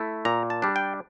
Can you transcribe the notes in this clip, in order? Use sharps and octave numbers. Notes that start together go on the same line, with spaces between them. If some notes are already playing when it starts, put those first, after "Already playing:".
Already playing: A3 E4
A#2 A#5
A5
G3 D4
G5